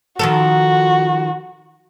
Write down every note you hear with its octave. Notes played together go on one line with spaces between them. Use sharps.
D#3 F3 F#4 A4